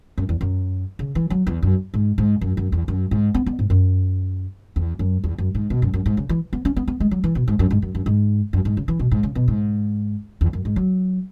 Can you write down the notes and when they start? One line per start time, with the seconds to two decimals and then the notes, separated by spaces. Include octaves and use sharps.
0.18 F#2
0.29 E2
0.41 F#2
0.99 C#3
1.15 E3
1.30 F#3
1.47 E2
1.62 F#2
1.94 G#2
2.18 G#2
2.41 F#2
2.57 F#2
2.72 E2
2.88 F#2
3.11 G#2
3.34 B3
3.46 B3
3.59 G#2
3.70 F#2
4.76 E2
4.99 F#2
5.24 E2
5.38 F#2
5.55 G#2
5.70 B2
5.82 F#2
5.94 F#2
6.06 G#2
6.17 C#3
6.29 E3
6.53 B3
6.65 C#4
6.76 B3
6.88 B3
7.00 G#3
7.11 F#3
7.24 E3
7.35 B2
7.48 G#2
7.59 F#2
7.71 G#2
7.82 F#2
7.95 F#2
8.06 G#2
8.53 F#2
8.65 G#2
8.77 C#3
8.88 E3
8.99 B2
9.11 G#2
9.23 C#3
9.35 B2
9.48 G#2
10.41 E2
10.53 F#2
10.65 G#2
10.76 F#3